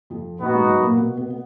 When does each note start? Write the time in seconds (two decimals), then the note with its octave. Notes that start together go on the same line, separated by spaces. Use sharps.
0.10 F2 F3
0.40 A#2 A#3 B3 D#4 F#4
0.54 G#2 G#3
0.69 F#2 F#3
0.83 A#2 A#3
0.97 B2 B3
1.17 B2 B3
1.30 B3